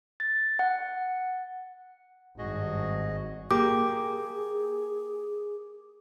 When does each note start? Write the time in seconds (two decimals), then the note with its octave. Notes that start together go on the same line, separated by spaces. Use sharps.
0.20 A6
0.59 F#5
2.38 G#1 G2 F#4 G#4 D#5
3.51 A#3 G4 G#4 D6